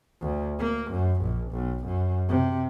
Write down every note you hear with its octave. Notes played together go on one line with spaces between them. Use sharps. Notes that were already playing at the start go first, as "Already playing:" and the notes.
D2
A#3
F#2
A#1
B1
F#2
C3